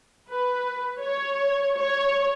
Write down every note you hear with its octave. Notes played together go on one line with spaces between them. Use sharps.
B4
C#5
C#5